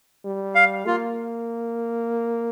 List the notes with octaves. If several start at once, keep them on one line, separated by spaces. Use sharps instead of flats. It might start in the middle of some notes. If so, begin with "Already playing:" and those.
G3
F5
A#3 F4